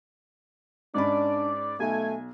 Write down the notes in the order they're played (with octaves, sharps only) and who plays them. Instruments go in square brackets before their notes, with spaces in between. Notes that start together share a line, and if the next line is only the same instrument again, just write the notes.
[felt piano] G#2 C#4 B5 [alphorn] D4 [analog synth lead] D5
[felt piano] B1 [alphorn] A3 [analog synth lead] G#5